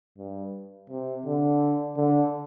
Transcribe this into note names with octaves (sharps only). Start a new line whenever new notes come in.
G2
C3
D3
D3